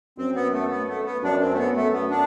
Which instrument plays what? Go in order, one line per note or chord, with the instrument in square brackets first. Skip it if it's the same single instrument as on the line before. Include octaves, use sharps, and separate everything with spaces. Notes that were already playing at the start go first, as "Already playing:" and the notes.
[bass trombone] F#2 [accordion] C4
[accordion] B3
A3
B3
A3
B3
[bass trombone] F#2 [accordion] D4
[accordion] C4
A3
B3
[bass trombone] F#2 [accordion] A3
[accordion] B3
D4